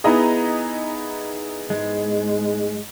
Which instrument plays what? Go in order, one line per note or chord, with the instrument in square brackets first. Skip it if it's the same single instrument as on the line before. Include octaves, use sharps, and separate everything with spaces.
[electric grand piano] B3 E4 G#4 [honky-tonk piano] D#4 D#5 A#5
[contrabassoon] G#2 [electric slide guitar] G#3